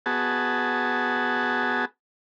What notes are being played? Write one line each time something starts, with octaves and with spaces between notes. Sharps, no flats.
B3 F#4 G#4 A5